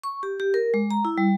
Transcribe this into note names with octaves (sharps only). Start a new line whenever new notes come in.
C#6
G4
G4
A#4
G#3
A#5
E4
G3